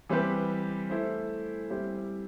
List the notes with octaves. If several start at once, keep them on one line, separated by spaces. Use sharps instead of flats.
E3 G3 C4 G4 B4
A3 E4 A4 C5
G3 C4 E4 G4